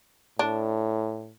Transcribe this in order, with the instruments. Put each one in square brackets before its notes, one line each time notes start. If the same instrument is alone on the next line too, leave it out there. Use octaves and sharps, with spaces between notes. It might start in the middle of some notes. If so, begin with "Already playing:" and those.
[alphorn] A2 [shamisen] D4